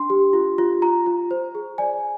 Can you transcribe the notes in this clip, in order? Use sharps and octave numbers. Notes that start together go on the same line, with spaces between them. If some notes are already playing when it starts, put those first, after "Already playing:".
Already playing: D4 C6
G4
F4
F4
F4 A#5
F4
C5
G#4
D5 G#5